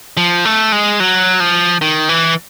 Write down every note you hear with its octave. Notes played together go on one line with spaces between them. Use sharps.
F3
A3
G#3
F#3
F3
D#3
E3